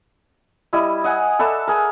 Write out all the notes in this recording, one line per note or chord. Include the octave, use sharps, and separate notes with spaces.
G3 E4 D#5
D#5 F#5 G#5
A4 B4 D5 E5
G#4 A#4